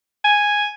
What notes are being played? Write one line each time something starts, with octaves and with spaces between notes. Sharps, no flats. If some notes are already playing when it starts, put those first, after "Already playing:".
G#5